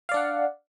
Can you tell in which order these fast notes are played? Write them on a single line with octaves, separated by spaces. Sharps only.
F5 D5 D4 F#5